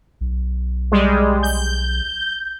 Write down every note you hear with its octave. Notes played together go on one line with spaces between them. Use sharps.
B1
G3 G#3
G6